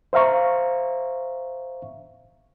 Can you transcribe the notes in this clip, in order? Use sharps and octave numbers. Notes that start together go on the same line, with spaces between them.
C5 E5 F5 A#5 C#6